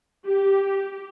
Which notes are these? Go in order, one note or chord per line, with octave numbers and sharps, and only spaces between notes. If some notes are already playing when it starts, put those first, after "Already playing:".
G4